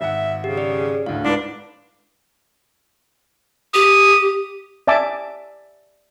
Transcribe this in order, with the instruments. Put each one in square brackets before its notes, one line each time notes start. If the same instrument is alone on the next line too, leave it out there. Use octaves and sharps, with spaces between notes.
[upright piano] G#1 F#5 [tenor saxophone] E5
[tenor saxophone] C#3 [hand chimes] G4
[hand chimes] G#4 D5
[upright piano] D2 A2 [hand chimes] F5
[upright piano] G#2 B4 [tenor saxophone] D4 [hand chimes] E4
[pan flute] G4 [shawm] D#6
[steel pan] D5 E5 G#5 A5 D6